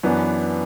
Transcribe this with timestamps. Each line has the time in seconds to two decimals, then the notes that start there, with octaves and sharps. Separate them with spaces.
0.03 F#2 E3 B3 D4